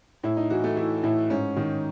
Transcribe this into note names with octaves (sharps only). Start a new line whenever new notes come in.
A2 E4
D#4
E3 F#4
A3
E3 E4
A2 E4
G#2 C#4
D#3